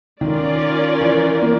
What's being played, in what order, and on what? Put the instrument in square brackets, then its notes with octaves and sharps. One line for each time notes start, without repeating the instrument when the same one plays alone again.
[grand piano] D#3 [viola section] C#4 F4 A#4 D5
[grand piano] E3
A#3